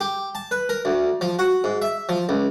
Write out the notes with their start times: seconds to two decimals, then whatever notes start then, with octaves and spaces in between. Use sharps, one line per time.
0.01 G4
0.35 A5
0.51 B4
0.69 A#4
0.85 D2
1.21 F3
1.39 F#4
1.64 G#2
1.82 E5
2.09 F3
2.29 C#2